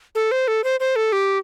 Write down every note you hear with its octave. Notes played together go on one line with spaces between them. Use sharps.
A4
C5
A4
C5
C5
A4
G4